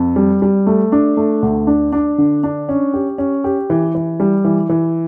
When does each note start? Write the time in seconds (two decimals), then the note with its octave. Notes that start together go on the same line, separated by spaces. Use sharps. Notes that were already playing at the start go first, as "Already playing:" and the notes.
Already playing: F2
0.16 G3
0.42 G3
0.67 A3
0.92 D4
1.17 A3
1.42 D2
1.67 D4
1.93 D4
2.18 D3
2.44 D4
2.69 C#4
2.94 G4
3.18 C#4
3.44 G4
3.70 E3
3.95 E3
4.20 G3
4.45 E3
4.69 E3